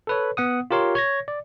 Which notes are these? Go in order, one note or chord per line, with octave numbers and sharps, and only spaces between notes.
A4 B4 C#5
B3 F#5 D#6
F4 G4 A#4 C#5 C6
C#5 G#6 A#6
D5